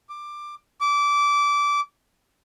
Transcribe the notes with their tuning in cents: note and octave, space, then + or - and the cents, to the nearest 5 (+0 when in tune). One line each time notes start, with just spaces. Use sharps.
D6 +15
D6 -20